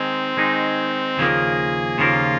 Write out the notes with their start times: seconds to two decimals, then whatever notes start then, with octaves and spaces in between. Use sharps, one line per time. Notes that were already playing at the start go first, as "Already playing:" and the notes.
Already playing: D#3 G#3 C4 D#4
0.37 D#3 G#3 D#4
1.17 D#2 C#3 F3 A#3 G#4
1.98 D#2 C#3 F3 A#3 F4